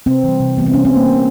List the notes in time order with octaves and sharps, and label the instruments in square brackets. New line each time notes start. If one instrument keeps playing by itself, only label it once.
[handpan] C3 C4
E3 G3
C3
E3 G3 B3
C4
C3 C#4
C4
E3 G3
A#3
C3